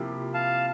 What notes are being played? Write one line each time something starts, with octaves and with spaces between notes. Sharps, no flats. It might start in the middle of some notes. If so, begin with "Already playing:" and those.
Already playing: C3 F3 A#3 E4 G4
F5 A5